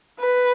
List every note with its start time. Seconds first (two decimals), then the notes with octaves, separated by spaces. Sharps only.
0.20 B4